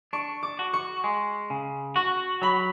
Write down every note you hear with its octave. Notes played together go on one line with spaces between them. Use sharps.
D4 C#6
D6
F#4
C#6
G#3
C#3
F#4 C#6
F#3 B5